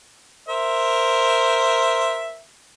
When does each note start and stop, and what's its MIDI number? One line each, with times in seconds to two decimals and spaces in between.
0.48 2.39 70
0.48 2.39 72
0.48 2.39 76